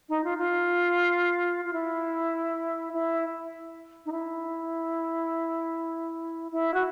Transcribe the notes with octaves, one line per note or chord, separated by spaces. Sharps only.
D#4
F4
F4
F4
E4
E4
D#4
E4
E4
F#4